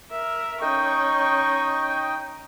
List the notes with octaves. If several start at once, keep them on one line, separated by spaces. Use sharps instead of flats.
A#4 E5
C#4 D#4 D#5 G5 C#6